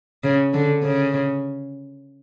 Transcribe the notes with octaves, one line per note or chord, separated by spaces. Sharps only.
C#3
D3
C#3